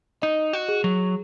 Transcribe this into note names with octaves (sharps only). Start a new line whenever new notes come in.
D#4 D#5
F#4
G#4
F#3